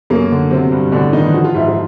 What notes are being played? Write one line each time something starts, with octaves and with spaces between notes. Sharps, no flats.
F#2 A#3
D3
C3 F#3 C4
G2
A2 D3 D4
D#3 E3 D#4
F3 F#4
F4
G#2 E4
F3 F4